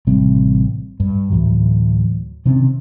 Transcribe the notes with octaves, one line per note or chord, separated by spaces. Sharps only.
A1 C3 G3 C4
G2
D2 A2 E3 F#3
C3 D#3 C4 C#4